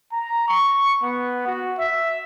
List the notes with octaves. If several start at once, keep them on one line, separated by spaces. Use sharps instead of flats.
A#5
C#6
B3
F#4
E5